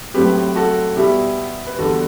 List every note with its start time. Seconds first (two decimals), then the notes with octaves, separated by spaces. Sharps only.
0.14 A2 F#3 C4 G4 B4
0.56 F#4 A4
0.96 B2 G3 B3 E4 G4
1.67 B4
1.79 E2 D3 G3 B3 F#4 A4